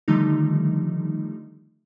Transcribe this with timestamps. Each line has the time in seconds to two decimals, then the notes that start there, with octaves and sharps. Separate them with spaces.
0.08 D3 D#3 F3 G3 A3 D#4